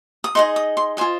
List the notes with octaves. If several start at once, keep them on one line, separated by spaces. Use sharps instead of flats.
D#6
D#4 G#4 D#5 C6
D#6
C6
F4 C5 D#5 G#5